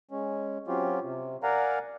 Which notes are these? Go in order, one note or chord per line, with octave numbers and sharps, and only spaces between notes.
G#3 C#4
F#3 C4 C#4 F4 G4
C3
A#4 D5 F5 F#5 G#5 A#5